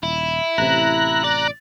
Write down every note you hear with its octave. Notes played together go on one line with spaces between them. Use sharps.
D#1 E4
A1 C3 A#5 F#6
D5